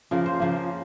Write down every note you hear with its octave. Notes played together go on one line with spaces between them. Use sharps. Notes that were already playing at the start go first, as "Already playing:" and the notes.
C#3 F3 A#3 A#4
C5
C#3 F3 A#3